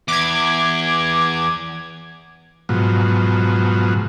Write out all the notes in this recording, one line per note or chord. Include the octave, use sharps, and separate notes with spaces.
E2 D6 G#6
G#2 B2 F3 F#3